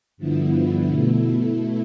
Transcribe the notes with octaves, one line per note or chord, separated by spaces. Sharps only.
G2 D3 F3 B3 E4
B2 A3 E4